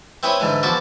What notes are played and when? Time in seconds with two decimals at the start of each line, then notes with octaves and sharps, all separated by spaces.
0.23 C4 E4 G#4 B4 C#5
0.40 G#2 D3 E3 G#3
0.63 E2 F3 F#4 E5 A5 D6